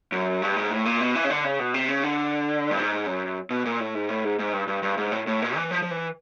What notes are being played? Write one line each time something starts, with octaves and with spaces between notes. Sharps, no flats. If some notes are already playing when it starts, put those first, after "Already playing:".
F#2
G2
G#2
A2
A#2
B2
E3
C#3
D3
C#3
B2
C3
C#3
D3
G2
G#2
F#2
B2
A#2
A2
G#2
A2
G#2
G#2
G2
G2
G2
G#2
A2
A2
A#2
E3
F3
F3
E3